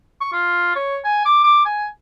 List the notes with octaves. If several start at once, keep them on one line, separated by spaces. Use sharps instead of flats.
C#6
F4
C#5
G#5
D6
D6
G#5